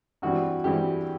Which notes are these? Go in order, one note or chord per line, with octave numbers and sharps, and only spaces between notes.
G2 E3 G3 C4 F#4
G2 E3 G3 C4 G4